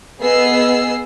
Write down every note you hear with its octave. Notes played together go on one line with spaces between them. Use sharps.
B3 G#4 D#5 E6 C7